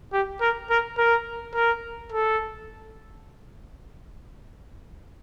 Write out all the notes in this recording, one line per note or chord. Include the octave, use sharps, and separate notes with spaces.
G4
A#4
A#4
A#4
A#4
A4